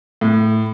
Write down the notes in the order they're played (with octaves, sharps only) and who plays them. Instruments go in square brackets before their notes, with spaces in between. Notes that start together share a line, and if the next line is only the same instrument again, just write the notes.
[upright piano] A2